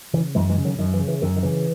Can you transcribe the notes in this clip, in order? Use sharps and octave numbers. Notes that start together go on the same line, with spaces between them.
C#3 E3
F#2 E3 G#3
E3 G#3
C#3
D#3 F#3
F#2 D#3
E3
C#3
E3
F#2 D#3
D#3
C#3 E3